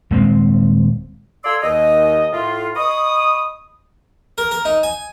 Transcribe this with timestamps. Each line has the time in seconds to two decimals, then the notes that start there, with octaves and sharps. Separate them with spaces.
0.11 D#1 G#3 C4
1.44 A4 D5 F5 G#5 C6 E6
1.62 D#2 D#5
2.33 A2 F4
2.75 D#5 B5 C#6 D#6
4.38 A#4
4.51 A#4
4.65 D#4
4.83 G#5